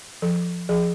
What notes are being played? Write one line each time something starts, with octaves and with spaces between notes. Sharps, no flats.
F3 A4
F3 G#4